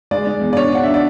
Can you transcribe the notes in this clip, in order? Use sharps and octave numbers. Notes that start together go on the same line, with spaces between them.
G#3 D5
G#3
E2
D5
D4 C#5
D4 F#5
D4 E5
D5